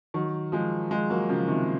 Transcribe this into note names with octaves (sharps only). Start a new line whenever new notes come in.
D#3 F#3
F3 G#3
F3 G#3
F#3 A#3
C#3 F3
C3 D#3